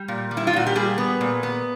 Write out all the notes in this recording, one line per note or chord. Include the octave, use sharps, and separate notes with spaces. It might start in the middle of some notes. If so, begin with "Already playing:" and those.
Already playing: G3
A#2
G3
E4
F4
A#2 F#4
G4
G3 G#4
B3
A#2
B3